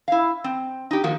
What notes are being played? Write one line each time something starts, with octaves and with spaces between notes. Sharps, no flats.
E4 F5
C4
D#4 G4
D#3 F3 A#3 F#4